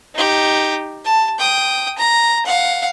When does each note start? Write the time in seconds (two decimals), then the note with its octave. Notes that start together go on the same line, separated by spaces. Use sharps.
0.15 D#4 G4
1.05 A5
1.39 G5 D#6
1.98 A#5
2.46 F5 F#5